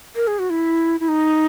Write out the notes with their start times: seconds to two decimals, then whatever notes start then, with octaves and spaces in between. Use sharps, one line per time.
0.16 A#4
0.27 G#4
0.39 F#4
0.50 E4
1.00 E4
1.08 D#4